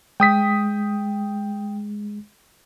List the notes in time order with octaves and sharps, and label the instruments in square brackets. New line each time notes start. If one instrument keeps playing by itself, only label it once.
[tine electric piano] G#3 [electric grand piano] G5 D#6 B6